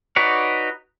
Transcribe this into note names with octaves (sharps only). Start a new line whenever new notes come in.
D#4 F#4 B4 C#5 D5